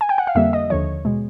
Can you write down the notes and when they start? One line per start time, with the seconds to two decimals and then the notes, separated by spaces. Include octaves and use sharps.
0.01 G#5
0.09 G5
0.18 F#5
0.27 F5
0.35 F2 D3 G3 A#3 E5
0.53 D#5
0.70 D#2 D3 F3 C#5
1.05 B2 G#3